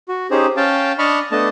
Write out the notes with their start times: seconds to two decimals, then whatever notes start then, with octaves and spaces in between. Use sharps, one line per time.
0.08 F#4
0.31 C#4 D#4 G4 G#4 C5
0.57 C#4 F5 G5 A5
0.99 D4 D#5 A5 B5 C#6 F6
1.32 A3 B3 D4 D#5 A5